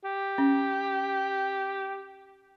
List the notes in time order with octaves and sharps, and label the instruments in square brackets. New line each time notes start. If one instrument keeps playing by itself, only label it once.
[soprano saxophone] G4
[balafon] C#4